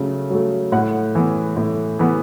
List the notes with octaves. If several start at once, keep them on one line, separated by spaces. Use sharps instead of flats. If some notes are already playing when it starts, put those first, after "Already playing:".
Already playing: C#3 F#3 A3
F#3 A3
A2 F#5
E3 B3
A2
E3 B3